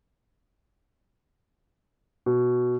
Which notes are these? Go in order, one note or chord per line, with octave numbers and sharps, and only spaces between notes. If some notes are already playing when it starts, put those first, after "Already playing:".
B2